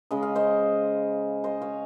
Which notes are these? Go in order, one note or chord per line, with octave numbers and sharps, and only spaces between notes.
C#3 G#3 D#5
F5
C5 D#5
C5 D#5
C#5 F5